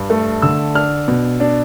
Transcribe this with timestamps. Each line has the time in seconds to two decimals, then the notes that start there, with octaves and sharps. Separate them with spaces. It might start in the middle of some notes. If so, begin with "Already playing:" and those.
Already playing: G2
0.10 A3
0.42 D3 E6
0.75 D4 F6
1.08 B2
1.40 D4